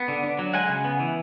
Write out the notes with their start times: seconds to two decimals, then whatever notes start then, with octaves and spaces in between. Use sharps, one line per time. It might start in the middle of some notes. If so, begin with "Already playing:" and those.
Already playing: B3
0.08 D3
0.23 D4
0.39 F#3
0.54 G#3 F#5 G#5
0.69 C#3
0.84 B3
1.00 E3